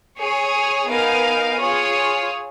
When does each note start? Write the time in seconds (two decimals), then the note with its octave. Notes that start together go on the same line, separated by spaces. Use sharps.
0.18 G#4 C#5 G#5
0.87 B3 D#4 A#4 F5 G#5
1.57 F4 G#4 C#5